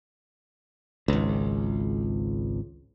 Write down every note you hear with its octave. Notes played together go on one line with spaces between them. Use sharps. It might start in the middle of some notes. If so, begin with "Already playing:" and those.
G#1 C#2